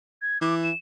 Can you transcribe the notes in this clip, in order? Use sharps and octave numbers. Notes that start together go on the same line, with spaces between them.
G#6
E3 D6
E7